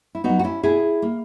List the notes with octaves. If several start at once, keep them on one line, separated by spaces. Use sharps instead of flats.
E4
F#3 B3 D#4 F#4
F#4
C#4 E4
B2 E4 G#4
A#3